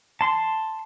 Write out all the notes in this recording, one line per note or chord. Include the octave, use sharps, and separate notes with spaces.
A5 C6